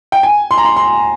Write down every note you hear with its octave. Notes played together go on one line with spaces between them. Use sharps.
G5
G#5
C6
A#5
C6
C6